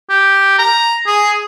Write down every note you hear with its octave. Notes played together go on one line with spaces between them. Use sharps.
G4
A#5
G#4